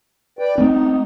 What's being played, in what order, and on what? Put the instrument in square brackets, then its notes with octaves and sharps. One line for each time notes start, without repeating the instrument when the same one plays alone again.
[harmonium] B4 D5 G5
[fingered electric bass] A3 C4 C#4 [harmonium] D#4